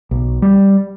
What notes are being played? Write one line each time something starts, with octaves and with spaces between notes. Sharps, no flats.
B1
G3